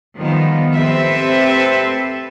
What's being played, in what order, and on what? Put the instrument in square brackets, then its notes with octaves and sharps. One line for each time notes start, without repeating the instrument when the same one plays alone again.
[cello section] D#3 F3 G3 B3
C4 G4 A4 B4 E5